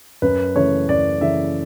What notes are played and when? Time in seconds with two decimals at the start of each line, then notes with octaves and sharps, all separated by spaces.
0.22 F#2 B4
0.56 C#3 E3 A3 C#5
0.89 F#2 D5
1.21 C#3 E3 A3 E5